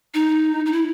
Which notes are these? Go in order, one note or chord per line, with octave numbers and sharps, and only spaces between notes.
D#4
D#4
E4